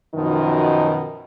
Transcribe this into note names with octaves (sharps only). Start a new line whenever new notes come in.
F#2 B2 D#3 F3 D#4